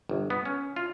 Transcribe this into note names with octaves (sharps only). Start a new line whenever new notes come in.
G1
B3
C#4
F4